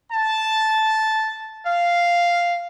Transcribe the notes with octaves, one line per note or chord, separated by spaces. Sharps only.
A5
F5